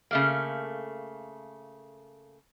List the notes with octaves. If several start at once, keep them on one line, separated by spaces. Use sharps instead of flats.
C#3 A3 A#3